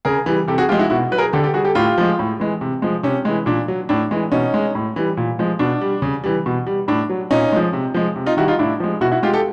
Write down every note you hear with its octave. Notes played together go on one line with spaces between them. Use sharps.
C#3 G#4 A#4
E3 G3
C3 G4 A4
F#4 G#4
F3 G#3 F4 G4
E4 F#4
B2 E4 F#4
F#3 B4
G#4 A#4
D3 G4 A4
G4 A4
G3 F#4 G#4
G4 A4
A2 F4 G4
F3 G#3
A2
E3 G#3
C3
F3 G#3
C3 C#4
E3 G#3
A#2 D4
F#3
A2 D4
E3 G#3
B2 C#4 D#4
G#3
A2
E3 G3
A#2
F3 G#3
B2 D4
G3
C#3
E3 G3
B2
G3
A2 D4
F#3
A#2 C#4 D#4
F3 G#3
C3
F3 G#3
C3
D#4 F4
D#3 G3 E4 F#4
D#4 F4
A2 D4 E4
F3 G#3
B2 E4 F#4
E4 F#4
G#3 F4 G4
G4 A4